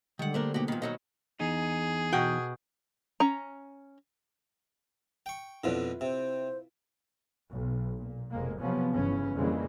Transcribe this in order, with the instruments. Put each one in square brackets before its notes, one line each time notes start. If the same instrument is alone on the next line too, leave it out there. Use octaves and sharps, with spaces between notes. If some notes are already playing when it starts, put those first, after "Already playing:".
[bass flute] D3 [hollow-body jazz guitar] D#3 F#5 [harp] G3 G#3
[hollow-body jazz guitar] G3 D4 A#4 [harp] A3 A#3 C5
[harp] B2 A#3 D#4 [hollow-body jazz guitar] F#4 G4
[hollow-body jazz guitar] A#2 D#3 [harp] B5
[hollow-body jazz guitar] D#3 F#3 D#4
[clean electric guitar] E2 D#4 [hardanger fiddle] G#4
[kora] B2 F#4 G5
[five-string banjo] C#4 A#5
[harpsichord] G5 C#6
[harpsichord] F2 B2 D3 [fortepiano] E4 F4 B4
[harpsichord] C3 [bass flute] C5
[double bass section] B1
A#2
F1 F2 G#3 A#3
C3 F3 F#3 B3 C#4
G1 C#3 E3 C#4
F2 C#3 E3 G3 G#3 A#3